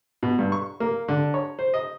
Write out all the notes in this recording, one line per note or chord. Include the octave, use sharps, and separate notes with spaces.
B2
G2
C#6
A#3
D3
C#5
C5
D#5